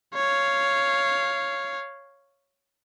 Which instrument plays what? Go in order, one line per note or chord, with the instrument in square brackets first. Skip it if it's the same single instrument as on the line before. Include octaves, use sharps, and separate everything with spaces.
[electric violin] C#5 F5